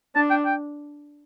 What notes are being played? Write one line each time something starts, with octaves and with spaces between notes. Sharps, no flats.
D4 A5
G5
G5